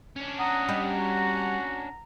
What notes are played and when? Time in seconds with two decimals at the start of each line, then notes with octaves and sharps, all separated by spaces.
0.16 C#4 D4
0.39 F#5 A#5 D#6
0.68 G3 G4 D#5
0.98 F#4